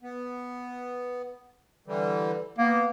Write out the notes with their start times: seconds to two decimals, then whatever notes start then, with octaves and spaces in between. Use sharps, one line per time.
0.02 B3
1.87 D3 E3 G3
2.58 A#3 B3